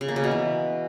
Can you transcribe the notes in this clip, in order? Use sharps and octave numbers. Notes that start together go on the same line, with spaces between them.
C#3
A#3
C#3
B2
E3